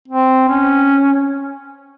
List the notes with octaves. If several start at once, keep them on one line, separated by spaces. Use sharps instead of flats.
C4
C#4